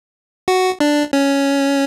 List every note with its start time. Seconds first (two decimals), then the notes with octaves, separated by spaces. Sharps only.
0.48 F#4
0.80 D4
1.13 C#4